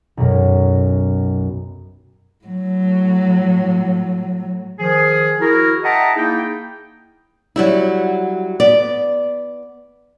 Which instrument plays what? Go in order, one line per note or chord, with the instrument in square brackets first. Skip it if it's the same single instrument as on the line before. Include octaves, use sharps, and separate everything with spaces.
[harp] B1 F#2
[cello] A2 F#3
[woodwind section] D#3 F3 G#4
E4 F#4 G#4 A#4
D#5 E5 F#5 G5 A5 A#5
A#3 D#4 E4 G#4 G5
[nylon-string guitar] F#3 G3 E4
B3 D5